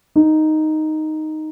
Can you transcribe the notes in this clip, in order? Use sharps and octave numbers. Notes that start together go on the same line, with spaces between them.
D#4